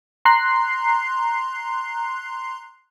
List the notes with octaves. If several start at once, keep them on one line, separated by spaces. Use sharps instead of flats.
A#5 C6 F#6 C7